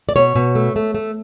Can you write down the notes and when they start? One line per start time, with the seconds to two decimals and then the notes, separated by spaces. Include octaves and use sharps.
0.09 D5
0.16 B2 C#5
0.36 B2
0.55 A3
0.76 A3
0.95 A3